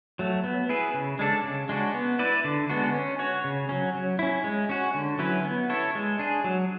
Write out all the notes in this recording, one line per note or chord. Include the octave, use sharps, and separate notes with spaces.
F#3 A3
B3
E4 G#4 B4
C#3
G#3 D4 A4 D5
C#3
G#3 D4 F#4
B3
E4 B4 D5
D3
G#3 B3 D4 F#4
C#4
F#4 C#5
C#3
F#3 C#4
F#3
C#4 E4
G#3
C#4 F#4
D3
F#3 C#4 E4 B4
B3
E4 A4 C#5
G#3
D4 G#4
F#3